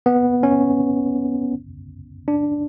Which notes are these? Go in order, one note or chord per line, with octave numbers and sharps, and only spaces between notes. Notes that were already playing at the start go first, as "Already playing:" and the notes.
B3
C#4
D4